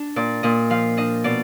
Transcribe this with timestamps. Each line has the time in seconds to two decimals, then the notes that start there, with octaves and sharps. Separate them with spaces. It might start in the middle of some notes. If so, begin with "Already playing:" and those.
Already playing: D4
0.16 A#2 D5
0.43 A#2 D#5
0.70 F3 F5
0.97 D4 D#5
1.24 B2 D5